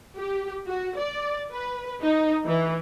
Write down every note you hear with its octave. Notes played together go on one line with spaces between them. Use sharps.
G4
F#4
D5
B4
D#4
E3